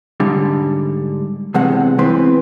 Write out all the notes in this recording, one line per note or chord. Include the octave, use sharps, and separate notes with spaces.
G#2 D3 G3
E2 G2 C3 G#3 F#5
E2 E3 C4 B4 C6